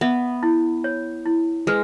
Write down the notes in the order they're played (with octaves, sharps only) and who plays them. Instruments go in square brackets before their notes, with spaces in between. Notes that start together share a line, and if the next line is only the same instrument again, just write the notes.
[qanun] B3 [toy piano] E5
[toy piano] E4
C#5
E4
[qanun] G#3 [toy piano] B4